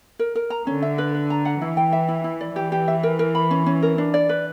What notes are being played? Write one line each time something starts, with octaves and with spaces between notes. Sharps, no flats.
A#4
A#4
A#5
D3 C#4
E5
B4
B4
A#5
F#5
E3 E4
G5
E5
E4
E4
D5
E3 G4
G4
E5
A#4
A#4
B5
C#4
C#4
A#4
D4
D5
B4